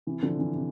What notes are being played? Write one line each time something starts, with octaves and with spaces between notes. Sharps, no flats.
C3 E3
D3 F3
C3 E3
C3